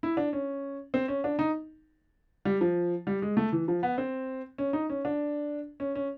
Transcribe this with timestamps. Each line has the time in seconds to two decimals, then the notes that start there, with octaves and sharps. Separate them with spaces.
0.03 E4
0.17 D4
0.33 C#4
0.94 C4
1.08 C#4
1.24 D4
1.39 D#4
2.45 G3
2.61 F3
3.07 G3
3.22 G#3
3.37 A3
3.52 E3
3.68 F3
3.83 B3
3.98 C4
4.58 C#4
4.73 D#4
4.90 C#4
5.05 D4
5.80 C#4
5.95 C#4